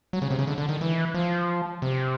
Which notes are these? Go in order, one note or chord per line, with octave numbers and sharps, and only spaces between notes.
F#3
C#3
C3
C#3
D3
D3
D#3
E3
F3
C3